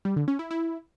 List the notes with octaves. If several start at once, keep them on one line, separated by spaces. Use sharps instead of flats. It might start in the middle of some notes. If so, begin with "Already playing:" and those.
G3
D3
C#4
E4
E4